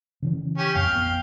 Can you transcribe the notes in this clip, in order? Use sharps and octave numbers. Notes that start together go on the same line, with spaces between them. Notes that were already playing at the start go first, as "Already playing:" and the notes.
C#3 E3 C#4
C#4 G4
A#1 F2 F5 G5
B3